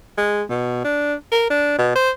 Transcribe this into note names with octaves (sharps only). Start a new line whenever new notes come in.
G#3
B2
D4
A#4
D4
B2
C5